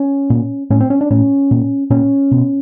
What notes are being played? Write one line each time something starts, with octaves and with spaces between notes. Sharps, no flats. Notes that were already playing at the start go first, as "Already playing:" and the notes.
Already playing: C#4
A#2
A2 C#4
C4
C#4
D4
A2 C#4
A#2
A#2 C#4
B2